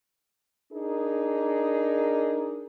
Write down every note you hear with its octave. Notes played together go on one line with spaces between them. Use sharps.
D4 D#4 G#4 A#4